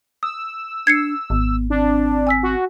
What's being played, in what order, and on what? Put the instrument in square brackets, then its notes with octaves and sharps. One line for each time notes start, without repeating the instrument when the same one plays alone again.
[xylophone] D#6 [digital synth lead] E6
[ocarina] D4 [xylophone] G#6 C7 C#7
[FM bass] G#1 [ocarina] B3
[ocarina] C4 [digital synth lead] D4
[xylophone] G#5 E6 B6
[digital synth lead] F#4